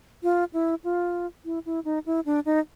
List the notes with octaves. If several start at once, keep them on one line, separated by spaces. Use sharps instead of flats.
F4
E4
F4
E4
E4
D#4
E4
D4
D#4